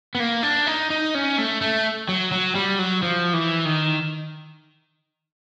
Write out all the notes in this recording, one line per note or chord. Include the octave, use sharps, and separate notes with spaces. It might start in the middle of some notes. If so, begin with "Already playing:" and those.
B3
A#3
D4
D#4
D#4
C#4
A3
A3
F#3
F#3
G3
F#3
F3
E3
D#3